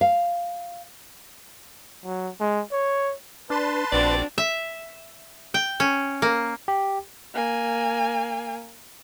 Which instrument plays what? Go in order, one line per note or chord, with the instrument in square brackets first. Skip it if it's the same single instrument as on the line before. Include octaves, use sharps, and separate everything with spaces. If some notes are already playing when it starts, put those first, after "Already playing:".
[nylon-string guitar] F5
[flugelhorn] F#3
G#3
C#5
[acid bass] D4 [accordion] B4 A5 C6
[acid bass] A#1 [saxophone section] C4 F#4 D5 [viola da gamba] D4
[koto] E5
G5
C#4
A#3
[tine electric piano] G4
[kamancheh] A#3 G#5